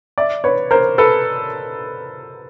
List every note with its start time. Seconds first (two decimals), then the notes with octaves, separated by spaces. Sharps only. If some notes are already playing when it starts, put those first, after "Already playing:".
0.18 D5 E5
0.44 B4 C#5
0.71 A#4 C5
0.98 A4 B4